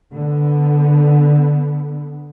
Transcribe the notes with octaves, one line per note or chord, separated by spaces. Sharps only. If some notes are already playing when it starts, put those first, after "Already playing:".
D3 B3